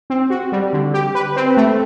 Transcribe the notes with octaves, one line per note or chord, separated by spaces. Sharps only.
C4
F#4
G3
D3
G4
B4
C4
A3